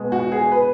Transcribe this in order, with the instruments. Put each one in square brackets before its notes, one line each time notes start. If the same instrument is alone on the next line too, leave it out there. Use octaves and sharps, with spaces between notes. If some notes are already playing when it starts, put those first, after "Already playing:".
Already playing: [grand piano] B2 G#3 B3
[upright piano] F#4
G#4
B4